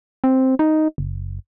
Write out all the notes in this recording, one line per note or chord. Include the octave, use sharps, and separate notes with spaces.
C4
D#4
F#1